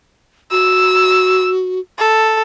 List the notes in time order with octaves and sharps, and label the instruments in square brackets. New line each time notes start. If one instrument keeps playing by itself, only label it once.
[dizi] F#4 [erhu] E6
[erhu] A4